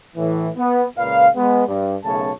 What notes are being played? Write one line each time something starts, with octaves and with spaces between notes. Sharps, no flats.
A2 E3
B3
C#2 A#2 B4 F5
G#3 B3
G2
B1 F#2 C#3 A3 C#5 A5